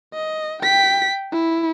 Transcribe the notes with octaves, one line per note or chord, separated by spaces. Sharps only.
D#5
G5 B6
E4